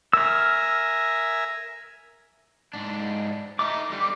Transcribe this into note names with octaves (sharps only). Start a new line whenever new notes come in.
A#4 E5 G#5 E6 F6
G#2 D4
A3 D#4 D6
D3 G3